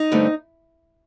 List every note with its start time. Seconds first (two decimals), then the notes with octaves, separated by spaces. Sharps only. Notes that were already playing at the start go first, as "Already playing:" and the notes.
Already playing: D#4
0.12 G2 D3 A3 C4